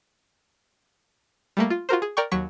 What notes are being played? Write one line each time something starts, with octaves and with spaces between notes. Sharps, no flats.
G3 A3 A#3
F4
F4 F#4 A#4 C5
G#4
A#4 D5 G5 C#6
D#2 F#3 C#6 B6